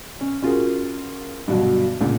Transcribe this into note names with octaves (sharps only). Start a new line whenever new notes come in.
C#4
C#4 F4 F#4 G#4 A#4
G2 B2 D3 F#3
C#2 A#2 D3